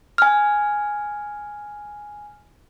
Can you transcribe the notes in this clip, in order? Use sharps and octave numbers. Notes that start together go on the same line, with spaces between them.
G#5 F6